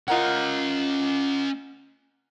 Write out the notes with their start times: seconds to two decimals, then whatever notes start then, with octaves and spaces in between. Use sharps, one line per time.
0.08 C#4 F4 A#4 D#5 F#5